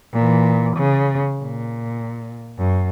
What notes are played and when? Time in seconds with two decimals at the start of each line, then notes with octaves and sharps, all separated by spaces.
0.14 A#2 E3
0.77 C#3
1.42 A#2
2.58 F#2